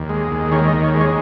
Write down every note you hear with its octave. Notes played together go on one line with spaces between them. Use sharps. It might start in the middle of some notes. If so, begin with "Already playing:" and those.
Already playing: D#2
G#3
D#2
D#3 C#5
D#5
D#2
C#5
G#3
C#5